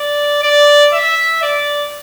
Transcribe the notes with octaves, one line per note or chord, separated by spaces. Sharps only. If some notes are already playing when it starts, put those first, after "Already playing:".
Already playing: D5
D5
E5
D5